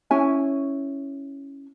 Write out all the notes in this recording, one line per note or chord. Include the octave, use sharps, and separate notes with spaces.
C#4 E4 G#5